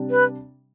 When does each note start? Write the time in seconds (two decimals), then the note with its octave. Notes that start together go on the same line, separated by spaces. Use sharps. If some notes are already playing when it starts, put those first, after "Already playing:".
Already playing: C3 G3 D4
0.10 B4